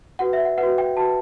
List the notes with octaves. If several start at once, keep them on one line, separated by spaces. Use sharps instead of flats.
F#4 B4 F#5
E5
F#5
B4 F#5
F#4
G5
F#4 B4 A5